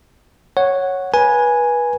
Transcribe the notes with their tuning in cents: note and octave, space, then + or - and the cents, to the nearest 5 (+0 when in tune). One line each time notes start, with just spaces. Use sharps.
C#5 -5 F#5 +0
B4 -25 G#5 +0